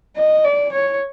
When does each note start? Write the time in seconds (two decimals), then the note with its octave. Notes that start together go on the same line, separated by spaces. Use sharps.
0.16 D#5
0.44 D5
0.72 C#5